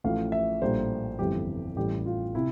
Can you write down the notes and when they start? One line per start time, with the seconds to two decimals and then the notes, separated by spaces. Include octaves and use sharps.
0.04 A1 A2 F3 F5
0.32 E5
0.62 A#1 A2 G3 A#3 C5
1.19 G1 F2 E3 G4
1.76 A1 A2 E3 G3 G4
2.06 F4
2.35 C3 E4